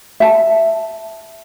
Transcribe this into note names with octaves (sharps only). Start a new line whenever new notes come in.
E5 A5